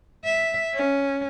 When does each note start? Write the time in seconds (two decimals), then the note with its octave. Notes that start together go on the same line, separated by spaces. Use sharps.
0.25 E5
0.75 C#4